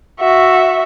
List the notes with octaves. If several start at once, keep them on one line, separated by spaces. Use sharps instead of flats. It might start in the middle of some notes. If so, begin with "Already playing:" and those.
F#4 E5